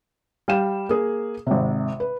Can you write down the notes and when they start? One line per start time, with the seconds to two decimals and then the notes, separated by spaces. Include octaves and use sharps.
0.48 G3 F5 G5 E7
0.89 A#3 G#4
1.47 G#1 C3
2.00 B4